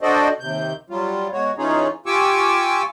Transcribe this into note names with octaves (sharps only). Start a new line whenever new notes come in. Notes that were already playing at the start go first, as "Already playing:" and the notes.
D4 F#4 A4 C5 D5 D#5
D#2 C3 G6
F#3 G3 F4
B2 G#3 F#4 C#5
E3 C#4 D#4 F4 G#4 C#5
F4 G4 G#5 C#6 D6 E6